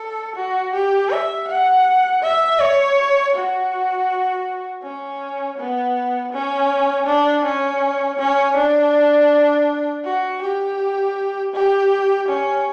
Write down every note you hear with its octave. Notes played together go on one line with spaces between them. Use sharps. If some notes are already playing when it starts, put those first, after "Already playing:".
Already playing: A4
F#4
G4
E5
F#5
E5
C#5
F#4
C#4
B3
C#4
D4
C#4
C#4
D4
F#4
G4
G4
C#4